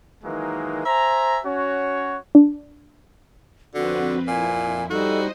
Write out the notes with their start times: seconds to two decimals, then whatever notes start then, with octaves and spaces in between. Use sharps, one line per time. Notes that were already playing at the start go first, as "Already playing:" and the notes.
0.24 D#3 E3 F#3 G#3 A#3 D#4
0.85 C5 E5 G#5 A#5
1.44 C#4 F#4 C#5
2.35 D4
3.74 F2 D3 C4 F#4 B4
4.27 F2 A#2 E4 G#5
4.90 G3 D#4 F#4 A4 C5 D#5